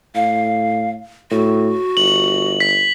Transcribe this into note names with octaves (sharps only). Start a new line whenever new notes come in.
A2 F5
A2 F#4
G1 F#7
B6